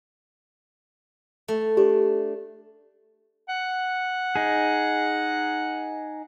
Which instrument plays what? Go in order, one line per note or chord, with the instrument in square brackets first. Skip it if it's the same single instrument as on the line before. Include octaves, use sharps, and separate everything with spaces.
[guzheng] A3
[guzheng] D4 [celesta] G4
[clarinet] F#5
[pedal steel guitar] D#4 G#4